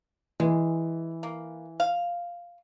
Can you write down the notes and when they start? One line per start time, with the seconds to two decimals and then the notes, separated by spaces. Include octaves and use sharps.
0.40 E3 G#3
1.23 A#3
1.80 F5